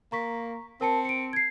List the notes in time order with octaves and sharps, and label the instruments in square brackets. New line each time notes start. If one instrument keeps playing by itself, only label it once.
[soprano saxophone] A#3 [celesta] A#5 C#6 B6
[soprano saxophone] C4 [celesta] A#4 A5 C#7
[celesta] C#7 D7
G#6 C7